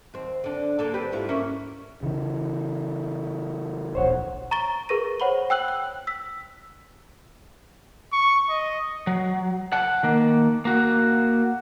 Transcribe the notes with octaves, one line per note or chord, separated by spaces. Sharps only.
D#2 C4
D3 D4
D3 A#3 A4
C4 G4 B4
G#2 E4 F4
A#3 C#4 E4
C#3 E3
D1 A#1 C5 C#5 F#5
A#5 C#6 A6 D7 G7
G#4 A#4 B4 C#6 A#6 D#7
C5 C#5 F#5 B5 F#7 G7
G5 E6 F#6 F#7
F#6
E6 B6
C#6
D#5
F#3
F#5 A5
D#3 A#3
A#3 F#4